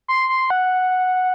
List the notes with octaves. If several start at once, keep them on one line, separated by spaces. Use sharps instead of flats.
C6
C6
F#5